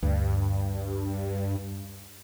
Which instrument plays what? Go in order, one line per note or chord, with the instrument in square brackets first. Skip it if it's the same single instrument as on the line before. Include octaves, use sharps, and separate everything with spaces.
[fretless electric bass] D2 [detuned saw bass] G2